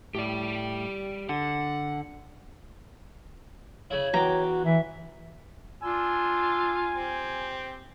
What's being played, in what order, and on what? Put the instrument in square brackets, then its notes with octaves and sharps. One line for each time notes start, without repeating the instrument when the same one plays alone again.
[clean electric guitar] A2 [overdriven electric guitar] G4 D5
[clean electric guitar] D3 [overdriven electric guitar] F#5
[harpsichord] C#3 E4 [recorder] C#5
[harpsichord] E2 G5 D6 [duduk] F#4 [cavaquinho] A#5
[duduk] E3 [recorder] E5
[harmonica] D4 C6 E6 [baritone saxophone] F4 [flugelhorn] G#5
[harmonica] C4 G4